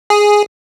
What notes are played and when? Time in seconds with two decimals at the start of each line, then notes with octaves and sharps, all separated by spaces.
0.10 G#4